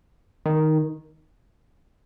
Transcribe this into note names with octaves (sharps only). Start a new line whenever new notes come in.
D#3